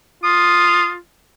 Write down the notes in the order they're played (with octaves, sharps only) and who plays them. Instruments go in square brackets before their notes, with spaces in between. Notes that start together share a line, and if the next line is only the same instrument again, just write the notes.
[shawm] F4 [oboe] D#6